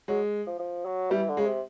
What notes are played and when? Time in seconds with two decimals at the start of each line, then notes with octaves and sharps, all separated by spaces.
0.08 F#3 G#3
0.47 F3
0.59 F3
0.85 F#3
1.11 E3 G3
1.29 D3
1.37 C#3 G#3
1.45 C3